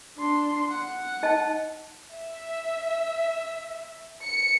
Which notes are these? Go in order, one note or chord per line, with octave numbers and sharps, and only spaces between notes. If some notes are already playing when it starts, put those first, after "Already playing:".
D4 C6
F#5
D#4 D#5 A5
E5
C#7